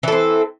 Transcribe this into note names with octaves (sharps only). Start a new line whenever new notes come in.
E3 C4 A4